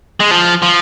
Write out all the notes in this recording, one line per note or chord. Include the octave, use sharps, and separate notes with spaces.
G#3
F3
F3